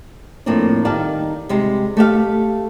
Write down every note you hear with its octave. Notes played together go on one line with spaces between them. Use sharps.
F2 A2 A#3 C4 D4
D#3 G3 D#4 D5 F5 A5
C3 G3 G#3
A3 G4 F5